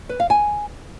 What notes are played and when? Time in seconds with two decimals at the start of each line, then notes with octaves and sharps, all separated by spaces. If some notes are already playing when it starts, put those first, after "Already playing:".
0.09 B4
0.20 F5
0.30 G#5